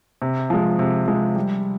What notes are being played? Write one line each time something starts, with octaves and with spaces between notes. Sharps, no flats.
C3
F3 G#3
C3
F3 G#3
G3